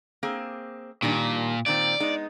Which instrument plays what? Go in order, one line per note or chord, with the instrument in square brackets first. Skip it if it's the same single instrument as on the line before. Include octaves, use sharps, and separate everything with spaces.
[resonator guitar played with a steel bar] A#3 C4 G#4
[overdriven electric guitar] A#2 [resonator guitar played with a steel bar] D#3 G3 D4
[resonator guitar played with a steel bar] A#2 D#3 C4 [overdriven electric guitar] D5
[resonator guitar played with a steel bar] G#3 B3 D#4